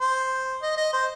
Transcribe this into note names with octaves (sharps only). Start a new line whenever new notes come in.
C5
D#5
D#5
C5